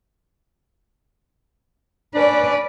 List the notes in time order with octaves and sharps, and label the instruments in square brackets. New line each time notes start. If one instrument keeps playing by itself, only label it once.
[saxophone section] C#4 D4 [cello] B4 D5